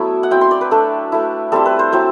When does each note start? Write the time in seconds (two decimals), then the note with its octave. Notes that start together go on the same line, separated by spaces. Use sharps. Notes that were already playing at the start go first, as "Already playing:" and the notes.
Already playing: F#3 A3 B3 D4 E4 E5
0.23 F#5
0.31 F#3 C4 E4 G5
0.41 C6
0.51 D5
0.61 B4
0.71 A3 D4 A4
1.12 A3 E4
1.52 G3 C4 E4 A4
1.66 B4
1.79 C5
1.92 F#3 C4 E4 C5